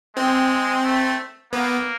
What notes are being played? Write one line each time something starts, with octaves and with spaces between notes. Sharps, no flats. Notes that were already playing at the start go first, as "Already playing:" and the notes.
G#3 C4
A3
A#3 B3